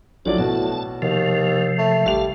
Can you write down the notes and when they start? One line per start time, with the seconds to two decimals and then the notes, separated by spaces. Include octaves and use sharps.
0.26 A#1 A2 F3 F#3 D4 D5
0.38 B2 F#4 A5
1.02 D#2 C3 F3
1.78 A3
2.06 A1 G3 F5 F7